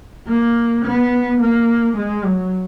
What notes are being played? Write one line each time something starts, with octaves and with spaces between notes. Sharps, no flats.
A#3
B3
A#3
G#3
F#3